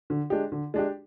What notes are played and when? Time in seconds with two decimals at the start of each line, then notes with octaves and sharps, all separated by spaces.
0.10 D3
0.30 G#3 D4 G4
0.52 D3
0.74 G#3 D4 G4